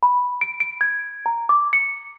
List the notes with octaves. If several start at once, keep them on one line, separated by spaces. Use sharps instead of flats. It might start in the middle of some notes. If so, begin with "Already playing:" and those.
B5
D7
D7
G#6
A#5
D6
C#7